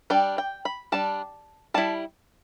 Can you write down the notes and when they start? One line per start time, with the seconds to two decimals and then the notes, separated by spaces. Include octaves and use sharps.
0.10 G3 D4 G5
0.38 G5
0.65 B5
0.92 G3 D4 A5
1.74 G3 E4 A5